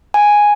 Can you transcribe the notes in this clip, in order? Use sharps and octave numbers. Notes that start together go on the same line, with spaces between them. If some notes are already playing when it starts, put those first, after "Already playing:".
G#5